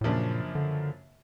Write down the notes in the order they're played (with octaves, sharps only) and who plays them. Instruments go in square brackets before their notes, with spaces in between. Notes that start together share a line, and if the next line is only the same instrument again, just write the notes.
[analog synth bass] A2
[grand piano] F#2 C#3 F3 A#3 D4 [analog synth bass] A#2
[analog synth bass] D3